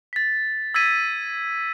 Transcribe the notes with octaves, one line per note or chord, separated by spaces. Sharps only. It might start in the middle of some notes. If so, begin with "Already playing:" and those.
A6 B6
E6 G#6 A6 B6 D#7